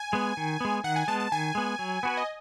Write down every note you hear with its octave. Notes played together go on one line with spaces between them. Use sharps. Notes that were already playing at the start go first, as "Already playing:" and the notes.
Already playing: G#5
G#3 B3
D#3
G#3 B3
D#3 F#5
G#5
G#3 B3 A5
A5
D#3 G#5
G#3 B3
F#3
B3 F#4 B4
D#5